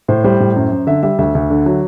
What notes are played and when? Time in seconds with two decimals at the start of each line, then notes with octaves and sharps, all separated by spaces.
0.08 A2 C5
0.24 G3 C5
0.40 A2
0.56 F#2
0.72 F#2
0.87 D3 E5
1.03 G3 E5
1.18 D2 E5
1.35 D2
1.50 D3
1.66 F#3